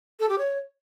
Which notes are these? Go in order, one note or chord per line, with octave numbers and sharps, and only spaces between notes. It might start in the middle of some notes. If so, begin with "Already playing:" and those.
A4
G4
C#5